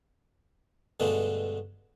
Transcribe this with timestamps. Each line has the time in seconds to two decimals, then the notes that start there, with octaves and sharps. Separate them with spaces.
1.00 G2 B2 D3 G#3 A3